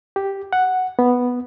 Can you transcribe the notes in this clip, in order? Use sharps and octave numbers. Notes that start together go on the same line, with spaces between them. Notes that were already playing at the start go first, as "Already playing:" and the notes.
G4
F#5
B3